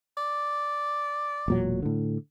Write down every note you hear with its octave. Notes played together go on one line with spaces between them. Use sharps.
D5
E1 A#2 F#3
A2 D3